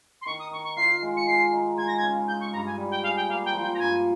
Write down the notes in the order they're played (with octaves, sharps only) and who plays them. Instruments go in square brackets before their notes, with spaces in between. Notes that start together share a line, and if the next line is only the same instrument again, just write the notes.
[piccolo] C6
[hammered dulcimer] D#3 [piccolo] C#6
[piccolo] D#6
[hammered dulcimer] D#3 [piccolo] C#6
[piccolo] C#6
[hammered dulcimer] F4 [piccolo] C7
[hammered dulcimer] G#3
[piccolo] C#7
[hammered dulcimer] G#3 [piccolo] C7
[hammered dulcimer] D#4
[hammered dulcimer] G#3 [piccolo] G#6
[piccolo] A#6
G#6
[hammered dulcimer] C#3
[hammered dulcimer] G#4 [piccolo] G6
[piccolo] C#6
[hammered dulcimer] G2 [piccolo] A#5
[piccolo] G#5
[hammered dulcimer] G3
[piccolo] G5
[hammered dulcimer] G#4 [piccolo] F5
[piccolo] G5
[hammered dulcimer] A#3 [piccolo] F5
[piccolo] G5
[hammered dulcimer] F3
[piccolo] G5
A#5
[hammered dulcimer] G2 [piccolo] G#5